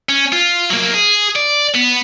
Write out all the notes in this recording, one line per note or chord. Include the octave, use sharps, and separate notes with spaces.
C#4
F4
F#3 A#3
G#4
D5
B3